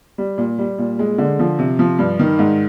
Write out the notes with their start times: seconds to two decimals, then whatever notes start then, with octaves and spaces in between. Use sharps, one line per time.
0.18 G3
0.38 A#2
0.59 G3
0.78 A#2
0.99 G#3
1.18 D3
1.39 F3
1.59 C3
1.79 F3
1.99 G2
2.19 D#3
2.39 G#2